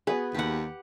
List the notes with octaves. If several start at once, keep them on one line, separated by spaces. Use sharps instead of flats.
B3 F#4 G#4 B4
D#2 G4 F#5